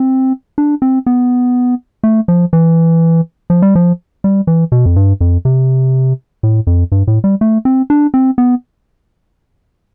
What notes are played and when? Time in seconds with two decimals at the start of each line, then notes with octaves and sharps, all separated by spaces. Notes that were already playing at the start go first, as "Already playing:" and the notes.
Already playing: C4
0.58 D4
0.82 C4
1.06 B3
2.03 A3
2.28 F3
2.53 E3
3.50 F3
3.62 G3
3.75 F3
4.24 G3
4.47 E3
4.72 B2
4.86 F2
4.96 G2
5.21 F2
5.45 C3
6.43 A2
6.67 F2
6.92 G2
7.07 A2
7.24 G3
7.41 A3
7.65 C4
7.90 D4
8.14 C4
8.38 B3